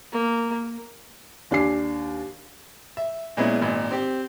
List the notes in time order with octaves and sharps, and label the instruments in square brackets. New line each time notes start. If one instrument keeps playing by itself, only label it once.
[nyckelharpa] A#3
[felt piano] D#2 D4 G#5 C7
[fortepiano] E5
A#2 G#3 B3 C#4 E4
G#1 A#2
C4 G4